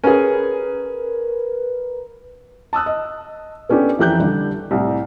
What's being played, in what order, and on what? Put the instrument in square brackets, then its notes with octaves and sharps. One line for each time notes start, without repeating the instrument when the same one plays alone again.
[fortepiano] C#4 G#4 [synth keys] A#4 B4
[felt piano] A5 D#6 E6 F#6
D#5
B3 C#4 D4 G4 A4
F2 E3 G4 A#5 F#6 G6
D3 G3
C2 A2